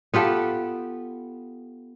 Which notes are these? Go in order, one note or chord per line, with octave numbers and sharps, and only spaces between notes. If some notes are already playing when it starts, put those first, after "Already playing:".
B3 F4 G4 A4